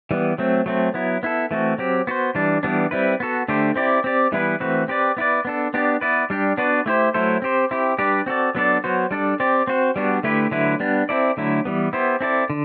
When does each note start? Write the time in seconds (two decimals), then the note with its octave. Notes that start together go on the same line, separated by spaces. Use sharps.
0.11 E3 G3 B3
0.38 F#3 A3 C4
0.66 F#3 A3 C4
0.94 F#3 B3 E4
1.23 B3 E4 A4
1.51 E3 A3 C4 F#4
1.78 F#3 C4 G4
2.07 B3 F#4 C5
2.35 E3 G3 D4
2.63 E3 G3 B3 D4
2.91 G3 C4 E4 B4
3.20 B3 F#4 A4
3.48 D3 A3 D4 G4 C5
3.76 C4 E4 G4 D5
4.04 C4 G4 D5
4.32 E3 G3 B3 E4 B4
4.60 E3 A3 C4 F#4 B4
4.88 C4 G4 B4 D5
5.17 B3 E4 B4 D5
5.45 B3 D4 A4
5.74 B3 D4 G4 D5
6.01 B3 E4 B4 D5
6.30 G3 D4 G4
6.57 B3 D4 F#4 B4 D5
6.86 A3 E4 G4 C5
7.14 F#3 A3 E4 A4 C5
7.42 C4 G4 C5
7.71 C4 E4 G4
7.98 G3 D4 G4 B4 D5
8.26 C4 F#4 A4 D5
8.55 F#3 B3 D4 A4 D5
8.84 F#3 B3 F#4 C5
9.11 G3 D4 A4 D5
9.40 C4 G4 D5
9.67 C4 F#4 C5
9.96 G3 B3 D4 F#4
10.23 D3 A3 E4 G4 B4
10.51 D3 F#3 A3 E4 B4
10.80 G3 B3 D4
11.09 C4 E4 A4 D5
11.37 D3 F#3 A3 E4
11.65 E3 G3 B3
11.93 B3 E4 G4 C5
12.21 C4 E4 A4 D5
12.50 D3